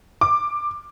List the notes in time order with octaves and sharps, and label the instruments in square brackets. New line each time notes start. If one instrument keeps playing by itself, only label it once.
[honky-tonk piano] D6